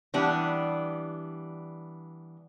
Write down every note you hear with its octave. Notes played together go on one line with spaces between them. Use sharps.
E3 G3 B3 D4